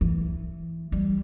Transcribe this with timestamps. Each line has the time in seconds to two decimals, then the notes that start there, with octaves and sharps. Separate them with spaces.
0.01 E3
0.92 G3